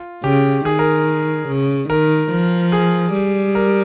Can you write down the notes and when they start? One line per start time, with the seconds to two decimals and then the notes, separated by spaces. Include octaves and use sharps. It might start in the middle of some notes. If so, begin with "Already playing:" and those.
Already playing: F4
0.24 C#3 G4
0.65 D#3 G#4
0.79 A#4
1.48 C#3
1.89 D#3 A#4
2.31 F3
2.72 G#4
3.14 G3
3.55 A#4